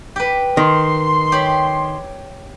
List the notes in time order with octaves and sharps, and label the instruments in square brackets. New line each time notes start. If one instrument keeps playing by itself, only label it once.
[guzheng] G4 B4
[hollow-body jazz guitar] D#3 [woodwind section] C6
[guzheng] G4 C#5 B5